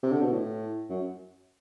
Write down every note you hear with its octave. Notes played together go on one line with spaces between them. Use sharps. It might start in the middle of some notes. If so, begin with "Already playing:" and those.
C3
D3
B2
A2
F#2